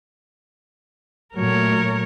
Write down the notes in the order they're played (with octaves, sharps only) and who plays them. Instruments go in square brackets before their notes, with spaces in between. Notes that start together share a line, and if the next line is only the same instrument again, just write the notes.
[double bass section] A#2 F#3 A3 [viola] A#4 C#5